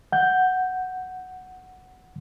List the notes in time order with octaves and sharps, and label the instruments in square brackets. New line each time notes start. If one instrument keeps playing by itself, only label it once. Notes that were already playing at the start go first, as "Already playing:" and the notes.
[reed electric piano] F#5 G6